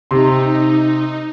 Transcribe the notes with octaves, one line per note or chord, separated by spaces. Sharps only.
C3 D#4 C6